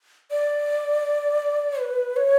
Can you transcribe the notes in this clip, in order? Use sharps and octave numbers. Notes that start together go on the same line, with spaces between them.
D5
B4
C#5